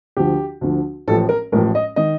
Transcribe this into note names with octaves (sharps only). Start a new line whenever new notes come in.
D2 D3 F3 G4
D2 D3 F3
A1 A2 F3 A4
A#4
A1 A2 F3 A#4
D#5
D#3 D#5